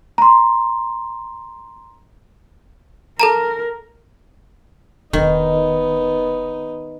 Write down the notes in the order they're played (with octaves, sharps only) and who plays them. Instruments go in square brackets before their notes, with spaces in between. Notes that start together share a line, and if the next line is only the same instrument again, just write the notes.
[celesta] A#5 C6
[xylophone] A4 A5 A#5 [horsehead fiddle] A#4
[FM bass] E1 [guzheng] D#3 [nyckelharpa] B3 D#4